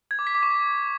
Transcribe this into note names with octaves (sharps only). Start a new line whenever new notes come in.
G#6
D6
B6
D6
C#6